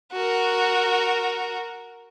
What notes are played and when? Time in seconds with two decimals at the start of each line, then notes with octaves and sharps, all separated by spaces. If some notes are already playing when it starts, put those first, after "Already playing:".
0.13 F#4 A#4